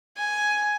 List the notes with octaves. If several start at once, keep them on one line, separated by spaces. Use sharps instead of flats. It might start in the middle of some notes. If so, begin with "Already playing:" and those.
G#5